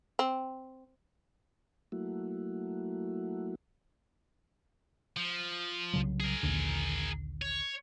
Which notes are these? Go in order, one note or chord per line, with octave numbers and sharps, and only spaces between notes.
C4
F#3 A3 A#3 E4 F#4
F3
C2 C#3 F#3
G#4 A#4
A#1 D#2 D3
C#5